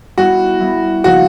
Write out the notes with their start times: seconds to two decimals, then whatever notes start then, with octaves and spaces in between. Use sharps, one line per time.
0.18 G3 B3 E4 F#4
0.60 G3 B3 E4
1.04 C#3 F3 A#3 D#4 F#4